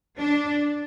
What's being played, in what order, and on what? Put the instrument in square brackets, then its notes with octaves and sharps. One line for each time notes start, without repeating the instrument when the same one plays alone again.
[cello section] D4